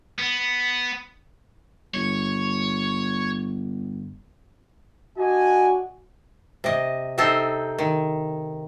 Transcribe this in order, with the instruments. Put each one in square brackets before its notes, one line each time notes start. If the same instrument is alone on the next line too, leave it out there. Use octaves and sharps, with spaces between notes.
[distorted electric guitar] B3
[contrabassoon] G1 [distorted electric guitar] C#5
[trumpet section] D4 D#5 G#5 [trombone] F#4
[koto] C3 D#5
C3 C4 D#4 A4 C5
D#3